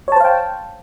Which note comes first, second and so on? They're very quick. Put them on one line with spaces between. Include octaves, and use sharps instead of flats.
C#5 A5 C5 F5 G5